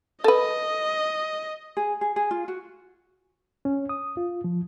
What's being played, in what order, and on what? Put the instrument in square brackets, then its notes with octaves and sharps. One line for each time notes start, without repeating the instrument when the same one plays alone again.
[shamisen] A4 B4 [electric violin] D#5
[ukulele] G#4
G#4
G#4
F4
F#4
[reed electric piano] C#4
D#6
F4
F3